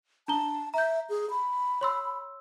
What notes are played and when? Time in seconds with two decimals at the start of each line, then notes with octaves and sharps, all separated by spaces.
0.28 D4 A5 A#5 G7
0.74 E5 A#5 G6
1.09 G#4
1.30 B5
1.81 C#5 C6 E6